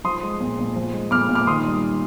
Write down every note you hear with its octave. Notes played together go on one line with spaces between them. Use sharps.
F3 C6 D#6
G#3
A#2
A#2
F3
G#3
A#2 D6 F6
A#2
D6 F6
D#3 C6 D#6
G3